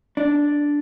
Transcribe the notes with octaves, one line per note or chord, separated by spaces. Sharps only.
D4